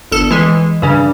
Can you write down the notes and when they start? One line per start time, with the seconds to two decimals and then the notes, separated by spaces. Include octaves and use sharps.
0.12 G1 A4
0.31 E3 G#3
0.82 G2 C#3